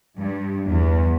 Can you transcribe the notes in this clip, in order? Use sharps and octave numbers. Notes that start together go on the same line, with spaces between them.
G2
E2